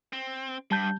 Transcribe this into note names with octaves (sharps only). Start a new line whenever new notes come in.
C4
G2 G3 A5 G6